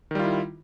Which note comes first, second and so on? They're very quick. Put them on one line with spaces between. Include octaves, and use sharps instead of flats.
D#3 G3 F4 E4